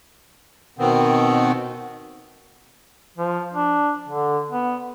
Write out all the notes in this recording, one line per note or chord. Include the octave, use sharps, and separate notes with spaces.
B2 D#3 B3 C4
F3
D4
D3
B3